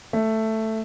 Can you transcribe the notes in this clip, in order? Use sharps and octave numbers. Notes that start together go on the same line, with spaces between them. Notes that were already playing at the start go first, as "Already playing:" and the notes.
A3